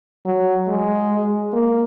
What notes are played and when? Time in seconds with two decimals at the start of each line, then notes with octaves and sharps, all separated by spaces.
0.26 F#3
0.68 G#3
1.53 A#3